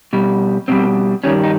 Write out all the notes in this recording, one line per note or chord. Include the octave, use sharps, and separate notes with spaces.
B2 G3
B2 G3 C4
G2 D#3 G3 C#4
D#4